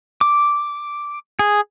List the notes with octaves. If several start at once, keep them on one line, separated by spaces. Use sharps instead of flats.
D6
G#4